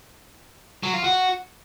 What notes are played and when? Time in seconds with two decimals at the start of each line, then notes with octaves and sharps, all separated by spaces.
0.83 F#3
0.94 F4
1.04 F#4